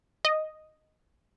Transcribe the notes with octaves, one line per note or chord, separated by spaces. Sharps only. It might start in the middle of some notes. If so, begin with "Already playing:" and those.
D#5